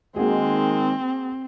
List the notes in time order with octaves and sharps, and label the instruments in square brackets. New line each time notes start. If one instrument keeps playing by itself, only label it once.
[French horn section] D#3 G#3 [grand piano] A#3 F#4 G#4 [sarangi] C4